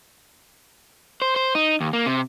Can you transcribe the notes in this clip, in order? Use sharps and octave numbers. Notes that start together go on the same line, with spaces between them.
C5
C5
D#4
D#2
A#3
C3